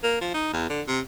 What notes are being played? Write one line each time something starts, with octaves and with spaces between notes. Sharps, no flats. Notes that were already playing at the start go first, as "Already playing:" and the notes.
A#3
F3
D#4
E2
D3
C3